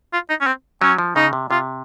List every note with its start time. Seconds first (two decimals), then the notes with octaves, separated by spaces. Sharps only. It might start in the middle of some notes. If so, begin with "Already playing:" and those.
0.13 F4
0.29 D#4
0.41 C#4
0.47 C4
0.82 F#3 C#4
0.98 F3
1.16 C#3 D#4
1.33 C3
1.51 C3 F4